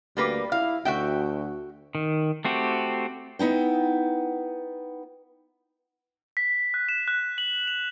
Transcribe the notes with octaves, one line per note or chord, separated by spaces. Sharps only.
D2 G3 A#3 B4
E4 F5
D2 F#4 E5 G5
D#3
A3 C4 F#4 G4
B3 D#4 E4 G5
B6
F#6
E7
F#6
F#7
F7